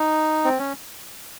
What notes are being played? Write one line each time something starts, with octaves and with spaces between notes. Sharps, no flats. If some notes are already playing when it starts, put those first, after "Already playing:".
Already playing: D#4
C4
C#4